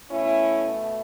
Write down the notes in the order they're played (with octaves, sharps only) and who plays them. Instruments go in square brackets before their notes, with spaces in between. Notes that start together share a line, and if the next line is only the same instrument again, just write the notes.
[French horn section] B2 A3 C#4 E4